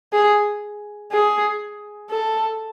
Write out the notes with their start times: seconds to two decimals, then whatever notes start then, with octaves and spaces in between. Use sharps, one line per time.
0.13 G#4
1.12 G#4
2.11 A4